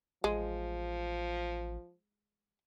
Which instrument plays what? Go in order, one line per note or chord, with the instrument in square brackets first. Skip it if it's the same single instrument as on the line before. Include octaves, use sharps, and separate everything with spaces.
[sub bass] A1 [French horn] F3 [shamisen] G#3